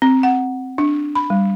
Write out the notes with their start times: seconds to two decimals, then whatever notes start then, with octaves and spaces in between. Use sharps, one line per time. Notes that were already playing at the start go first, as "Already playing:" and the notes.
0.02 C4
0.23 F#5
0.78 D4
1.15 B5
1.30 G3